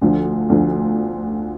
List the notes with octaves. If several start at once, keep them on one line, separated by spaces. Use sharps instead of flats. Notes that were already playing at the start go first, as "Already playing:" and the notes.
D2 D3 F3
D2 D3 F3